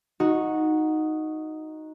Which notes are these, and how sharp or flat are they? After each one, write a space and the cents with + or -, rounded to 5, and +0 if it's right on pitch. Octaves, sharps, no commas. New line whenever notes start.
D#4 +0 F#4 -10